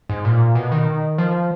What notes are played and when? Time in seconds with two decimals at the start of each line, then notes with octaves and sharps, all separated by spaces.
0.09 G#2
0.25 A#2
0.55 B2
0.72 D#3
1.18 F3